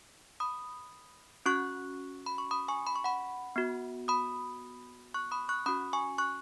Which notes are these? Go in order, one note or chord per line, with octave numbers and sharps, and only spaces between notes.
B5 D#6
C#4 F#4 C#6 F#6
B5
C#6
B5 D#6
G#5 C#6
B5
C#6
F#5 B5
B3 F#4
B5 D#6
C#6 F#6
B5 D#6
C#6 F#6
C#4 F#4 B5 D#6
G#5 C#6
C#6 F#6